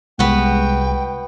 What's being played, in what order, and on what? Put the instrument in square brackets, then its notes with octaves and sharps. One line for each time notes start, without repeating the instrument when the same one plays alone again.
[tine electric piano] C2 [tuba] G#3 [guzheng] B3 F#4 [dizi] G5